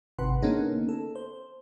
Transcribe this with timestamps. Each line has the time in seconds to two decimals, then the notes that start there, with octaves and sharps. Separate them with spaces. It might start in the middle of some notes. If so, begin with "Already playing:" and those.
0.18 G#1 C3 B4 F#5 C6
0.42 D3 A#3 B3 C#4 D#4 G#4
0.89 A4
1.15 C5